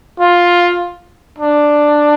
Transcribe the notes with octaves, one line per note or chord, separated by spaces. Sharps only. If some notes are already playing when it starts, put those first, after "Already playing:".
F4
D4